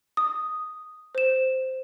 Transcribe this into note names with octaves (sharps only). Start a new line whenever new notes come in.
D#6
C5 E7